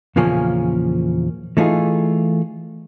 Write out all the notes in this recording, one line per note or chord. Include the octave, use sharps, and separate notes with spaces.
E2 A#2 C#3 F3 A#3 C#4
E3 A3 D#4 F4 G#4